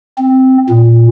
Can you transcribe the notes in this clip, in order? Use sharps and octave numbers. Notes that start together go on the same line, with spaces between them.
C4
A#2